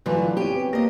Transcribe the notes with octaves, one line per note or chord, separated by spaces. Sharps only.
G2 D3 E3 F#3 A3 F4 F#4 B4
G3 B3 C4 G4 C#5 D#7
A#3 G4 D#5 A#6